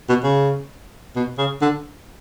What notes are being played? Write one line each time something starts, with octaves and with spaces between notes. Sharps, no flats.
B2
C#3
B2
C#3
D3